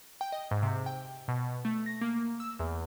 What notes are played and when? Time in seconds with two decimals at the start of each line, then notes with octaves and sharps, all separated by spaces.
0.21 G5
0.32 D#5
0.51 G#2
0.63 C3
0.86 G5
1.28 B2
1.65 A3
1.86 A#6
2.01 A#3
2.40 E6
2.59 E2